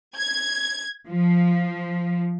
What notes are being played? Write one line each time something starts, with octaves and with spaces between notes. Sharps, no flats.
G#6
F3